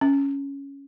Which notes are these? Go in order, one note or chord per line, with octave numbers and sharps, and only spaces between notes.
C#4